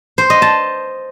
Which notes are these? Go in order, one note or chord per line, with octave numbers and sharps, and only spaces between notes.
C5
D#5
A5